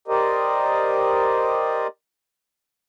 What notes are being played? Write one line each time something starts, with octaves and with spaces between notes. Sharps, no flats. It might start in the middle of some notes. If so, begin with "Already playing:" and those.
G4 A#4 C5 D5 D#5